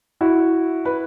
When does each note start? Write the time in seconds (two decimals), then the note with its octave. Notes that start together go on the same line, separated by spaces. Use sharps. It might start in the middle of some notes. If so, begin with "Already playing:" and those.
0.21 E4 F#4
0.85 B4